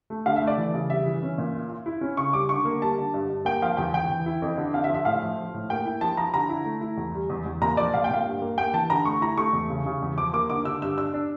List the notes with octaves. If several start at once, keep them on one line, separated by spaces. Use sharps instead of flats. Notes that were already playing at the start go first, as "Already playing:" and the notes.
A3
D3 F5
E5
A3
D5
E3
C#3
G3 E5
E3
C#4
A#2
F4
F4
E4
C#4
C#3 C#6
G3 D6
D3 C#6
A#3
G3 A5
D3
G2
G2
A#3 G5
F3 F5
E2 G5
E2 G5
E3
E4
F2
D3
F2 F5
E5
F3
E5
A2 F5
F3
F3
A2
A#3 G5
E4
F3 A5
F3 A#5
D3 A#5
E4
A3
E4
E2
G3
E2
E2
A#2 A#5
F3 D5
A#2 F5
G5
A#2 F5
G2
A#3
A#3 G5
E3 A5
D3 A#5
A3 C#6
E4 A#5
A3 C#6
E2
C#3
C#3
E2
F3 D6
A#3 D6
D3 D6
D3 E6
G2 E6
D4 E6
D4